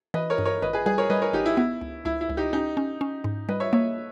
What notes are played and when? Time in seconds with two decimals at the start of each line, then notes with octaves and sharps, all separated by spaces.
0.14 E3 B4 D#5
0.30 A#4 C#5
0.38 G2
0.45 A#4 C#5
0.62 G#1 B4 D#5
0.73 G#4 B4
0.86 G3 G#4 B4
0.98 A#4 C#5
1.10 G3 B4 D#5
1.22 A#4 C#5
1.33 G#1 D#4 G4
1.46 E4
1.57 B3 E4
1.81 C#2
2.05 C#2 E4
2.21 E4
2.30 C#2
2.37 D#4 G4
2.53 C#4 D#4 G4
2.77 C#4
3.01 C#4
3.24 G#2
3.49 G3 B4 D#5
3.60 C#5 E5
3.73 A#3 C#5 E5